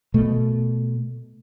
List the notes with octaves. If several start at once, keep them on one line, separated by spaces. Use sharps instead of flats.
B2 A3